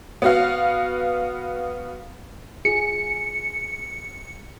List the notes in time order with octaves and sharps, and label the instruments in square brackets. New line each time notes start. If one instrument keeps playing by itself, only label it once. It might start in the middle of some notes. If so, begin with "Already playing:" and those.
[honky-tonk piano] B3 F#4 F5
[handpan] F4 G#4 [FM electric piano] C#7